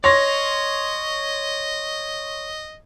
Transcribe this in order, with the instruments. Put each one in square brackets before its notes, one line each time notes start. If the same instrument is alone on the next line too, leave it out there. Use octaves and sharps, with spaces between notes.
[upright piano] C#5 C6 A#6 [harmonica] D#5